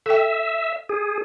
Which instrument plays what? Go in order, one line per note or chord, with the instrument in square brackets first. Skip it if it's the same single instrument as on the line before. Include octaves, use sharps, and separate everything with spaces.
[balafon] A4 G5 [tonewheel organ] E5
[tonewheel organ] G#4